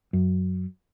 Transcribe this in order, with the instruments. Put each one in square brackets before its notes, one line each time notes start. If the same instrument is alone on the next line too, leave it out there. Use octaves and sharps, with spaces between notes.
[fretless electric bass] F#2